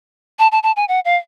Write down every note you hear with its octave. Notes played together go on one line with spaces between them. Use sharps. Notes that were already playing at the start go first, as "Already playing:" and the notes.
A5
A5
A5
G#5
F#5
F5